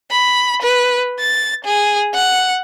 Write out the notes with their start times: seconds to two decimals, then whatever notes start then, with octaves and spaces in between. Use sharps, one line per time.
0.12 B5
0.62 B4
1.20 A6
1.65 G#4
2.14 F#5